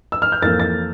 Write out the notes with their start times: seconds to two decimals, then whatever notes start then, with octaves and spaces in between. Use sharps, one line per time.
0.12 E6
0.22 F6
0.32 G6
0.42 F2 E3 A#3 A6
0.60 A6